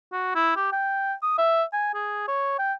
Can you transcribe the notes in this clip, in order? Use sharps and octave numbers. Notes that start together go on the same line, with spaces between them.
F#4
E4
G4
G5
D#6
E5
G#5
G#4
C#5
G5